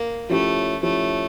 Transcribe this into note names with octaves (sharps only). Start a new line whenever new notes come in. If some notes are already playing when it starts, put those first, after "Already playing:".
Already playing: A#3
F3 A3 C#4 E4 G4 C#5
F3 A3 C#4 E4 G4 C#5